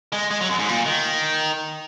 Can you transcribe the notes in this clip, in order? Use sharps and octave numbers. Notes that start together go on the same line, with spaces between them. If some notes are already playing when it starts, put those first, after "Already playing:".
G#3
G#3
F#3
F#2
G#2
A#2
D#3